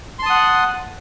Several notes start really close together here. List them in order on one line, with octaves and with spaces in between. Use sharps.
C6 A5 D#6 F#5